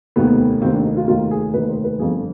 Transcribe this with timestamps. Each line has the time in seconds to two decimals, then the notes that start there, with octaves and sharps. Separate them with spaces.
0.16 F1 D#2 D#3 B3
0.62 F1 D#2 D#3 C4
0.73 D4
0.85 D#4
0.96 F4
1.07 F1 D#2 D#3 F4
1.31 G#4
1.53 F1 D#2 D#3 B4
1.69 C5
1.84 B4
1.99 G1 F2 D3 F3 G#4